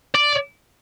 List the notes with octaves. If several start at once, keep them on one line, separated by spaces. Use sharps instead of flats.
D5